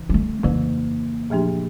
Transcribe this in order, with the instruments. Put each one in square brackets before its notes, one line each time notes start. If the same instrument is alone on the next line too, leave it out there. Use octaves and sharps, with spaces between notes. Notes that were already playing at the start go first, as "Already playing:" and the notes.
Already playing: [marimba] F2 C#3 E3
[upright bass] G#3
A3
[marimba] F2 C#3 E3 [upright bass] A#3
[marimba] A#2 F3 A3 D4 G4